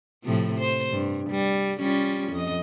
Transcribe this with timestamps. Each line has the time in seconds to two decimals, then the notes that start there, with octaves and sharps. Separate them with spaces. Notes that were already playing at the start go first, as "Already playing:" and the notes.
0.24 A2 C3 F3
0.59 C5
0.91 G2
1.30 G3
1.80 G3 C#4 F4
2.32 F2 D#5